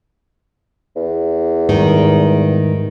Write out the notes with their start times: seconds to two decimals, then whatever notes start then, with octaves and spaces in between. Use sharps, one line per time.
0.96 E2
1.69 G#2 D#3 G3